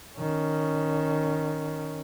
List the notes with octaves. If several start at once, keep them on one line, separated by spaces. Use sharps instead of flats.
D#3 C#4